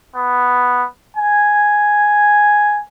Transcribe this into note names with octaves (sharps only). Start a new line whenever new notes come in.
B3
G#5